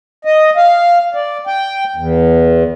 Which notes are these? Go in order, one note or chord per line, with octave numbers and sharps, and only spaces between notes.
D#5
F5
D5
G5
E2